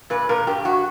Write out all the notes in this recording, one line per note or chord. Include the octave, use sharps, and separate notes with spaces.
A#2 B4
A#2 A#4
G2 G4
G2 F#4